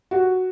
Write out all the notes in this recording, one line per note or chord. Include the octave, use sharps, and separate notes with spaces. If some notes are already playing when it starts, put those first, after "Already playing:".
F#4